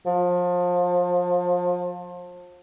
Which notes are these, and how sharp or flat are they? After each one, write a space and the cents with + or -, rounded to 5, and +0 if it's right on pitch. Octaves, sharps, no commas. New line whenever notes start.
F3 +30